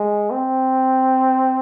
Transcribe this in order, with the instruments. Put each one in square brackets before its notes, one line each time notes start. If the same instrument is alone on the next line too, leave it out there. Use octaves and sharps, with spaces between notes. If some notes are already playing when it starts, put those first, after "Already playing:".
Already playing: [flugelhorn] G#3
C4